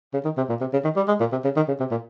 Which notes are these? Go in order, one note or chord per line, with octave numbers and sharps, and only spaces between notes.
C#3
D#3
C3
A#2
C3
C#3
D#3
G3
G#3
A#2
C3
C#3
D#3
C#3
C3
A#2